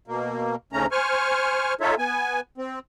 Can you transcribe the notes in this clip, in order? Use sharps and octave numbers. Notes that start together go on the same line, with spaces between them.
B2 A#3
D2 G#2 C#3 A3 C#4 A#5
C5 G#5 C#6 F6
D#4 F4 A4 C#5 E5
B3 G#5
C4